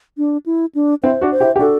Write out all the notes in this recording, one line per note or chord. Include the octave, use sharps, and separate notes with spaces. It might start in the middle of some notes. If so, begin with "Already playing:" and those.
D4
E4
D4
C4 E4 C5
D4 F#4
C5
E4 G4
G4
D4 F#4 A4